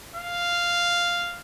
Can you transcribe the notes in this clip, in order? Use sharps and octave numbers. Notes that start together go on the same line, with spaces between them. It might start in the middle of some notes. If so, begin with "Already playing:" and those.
F5